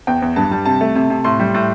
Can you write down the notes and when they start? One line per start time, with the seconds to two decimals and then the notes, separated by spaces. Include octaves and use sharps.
0.07 E2 G5
0.22 E2
0.36 G2 A5
0.51 G3 A5
0.65 C3 A5
0.81 A3
0.95 C3
1.10 C3
1.24 A2 C6
1.39 G3
1.54 A2